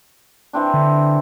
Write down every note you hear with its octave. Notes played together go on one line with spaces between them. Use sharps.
E3 C4 D4
D3